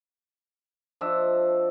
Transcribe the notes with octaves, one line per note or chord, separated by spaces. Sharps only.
F3 D4 D#5 E5